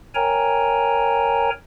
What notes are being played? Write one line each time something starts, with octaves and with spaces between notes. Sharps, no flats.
A#4 C#5 G5 G#5 A#5